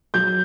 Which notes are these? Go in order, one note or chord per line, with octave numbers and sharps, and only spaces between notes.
F#3 G6